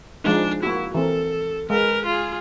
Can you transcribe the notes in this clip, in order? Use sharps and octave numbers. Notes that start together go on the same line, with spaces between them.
F3 G#3 D4 D#4
A#3 E4 F#4
E3 C4 A4 A#4
G#3 A#4 B4
F4 G#4